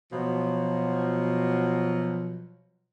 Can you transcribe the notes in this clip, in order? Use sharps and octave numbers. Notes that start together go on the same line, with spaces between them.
B2 F3 F#3